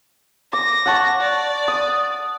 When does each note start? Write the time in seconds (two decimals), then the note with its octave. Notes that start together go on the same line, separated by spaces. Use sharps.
0.53 D6 A#6
0.86 F#5 A5 C#6
1.21 D5
1.68 D#6